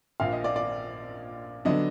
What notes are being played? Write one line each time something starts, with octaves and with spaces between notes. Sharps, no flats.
A#1 A#2 F3 F5
D#5
D5
D5
D3 F#3 B3 D4 D#5